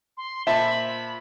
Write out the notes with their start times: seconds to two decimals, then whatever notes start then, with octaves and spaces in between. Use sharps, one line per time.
0.17 C6
0.47 A#2 C5 E5 A5 B5